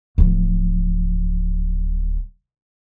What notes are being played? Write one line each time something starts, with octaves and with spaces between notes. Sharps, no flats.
D1 F3